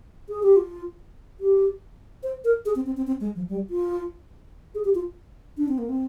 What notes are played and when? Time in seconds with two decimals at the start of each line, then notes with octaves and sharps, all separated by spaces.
0.29 G#4
0.43 G4
0.56 F4
1.40 G4
2.23 C5
2.44 A#4
2.65 G#4
2.75 C4
2.86 C4
2.97 C4
3.07 C4
3.21 G#3
3.36 F3
3.49 G3
3.70 F4
4.75 G#4
4.85 G4
4.95 F4
5.58 D4
5.68 C4
5.78 A#3
5.89 C4